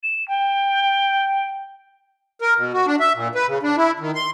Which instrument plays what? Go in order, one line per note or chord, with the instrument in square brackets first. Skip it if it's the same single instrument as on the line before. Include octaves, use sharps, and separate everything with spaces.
[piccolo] E7
G5
[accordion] A#4
B2
F#4
D4
E5
A#2
B4
C#3
D4
E4
D#3
C6